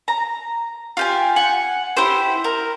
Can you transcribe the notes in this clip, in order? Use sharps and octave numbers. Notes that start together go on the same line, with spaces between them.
A#5
F4 G4 G#5
F#5 G#5
E4 G4 C5
A#4